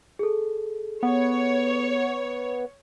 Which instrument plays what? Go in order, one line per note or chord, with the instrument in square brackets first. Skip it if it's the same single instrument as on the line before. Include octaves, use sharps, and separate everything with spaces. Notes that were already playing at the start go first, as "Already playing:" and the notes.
[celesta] G#4 A4
[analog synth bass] B3 [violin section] C#5